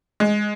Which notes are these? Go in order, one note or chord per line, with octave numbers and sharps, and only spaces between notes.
G#3